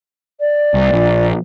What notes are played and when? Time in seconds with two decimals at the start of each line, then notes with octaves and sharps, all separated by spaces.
0.40 D5
0.74 C2
0.92 A#1